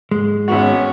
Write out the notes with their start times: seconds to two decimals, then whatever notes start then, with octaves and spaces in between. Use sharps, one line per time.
0.11 G#2 G#3
0.48 G#1 B3 C#4 F#4